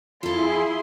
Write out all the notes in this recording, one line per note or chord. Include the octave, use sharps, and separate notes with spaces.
F2 E4 F4 G#4 A4 C6